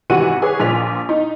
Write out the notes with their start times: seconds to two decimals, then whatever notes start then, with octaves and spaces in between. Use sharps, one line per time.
0.10 G#1 C3 E3 F#4 F#5 D#7
0.42 G#4 B4 C#5 G#5 D6
0.60 A#1 A#2 F3 B6 F7
1.09 D#4